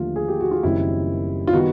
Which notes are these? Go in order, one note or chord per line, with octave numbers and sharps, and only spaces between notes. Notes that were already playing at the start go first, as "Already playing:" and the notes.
Already playing: D#2 D3 F3 A3 F4
G#4
G4
F#4
F4
F#1 F#2 D#3 G3 C4 E4
F4
D#3 G3 B3 F#4